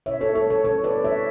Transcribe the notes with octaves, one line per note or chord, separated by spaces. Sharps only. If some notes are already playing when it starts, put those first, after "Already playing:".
B2 C#5 E5
A4 C#5
G3 A4 C#5
A4 C#5
B2 A4 C#5
B4 D5
G3
C#5 E5